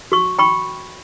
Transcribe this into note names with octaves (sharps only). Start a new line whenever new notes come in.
F#4 C#6
G5 B5 C#6